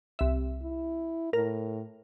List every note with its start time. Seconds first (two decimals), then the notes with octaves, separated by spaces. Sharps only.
0.19 C2 E5
0.62 E4
1.33 A2 A#4